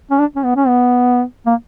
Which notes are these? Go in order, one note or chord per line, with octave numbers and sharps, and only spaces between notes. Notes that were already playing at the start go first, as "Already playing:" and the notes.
C#4
D4
C#4
B3
C#4
B3
A#3